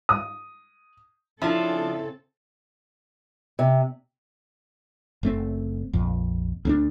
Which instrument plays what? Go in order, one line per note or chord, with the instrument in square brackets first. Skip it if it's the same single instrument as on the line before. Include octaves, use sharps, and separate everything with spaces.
[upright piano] D#6
[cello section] C#3 C4 A4 [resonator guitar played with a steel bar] F3 D4 [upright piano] E4
[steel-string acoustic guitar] C3
[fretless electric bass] F#1 A3 C4
A#1 F2
D2 C4 D4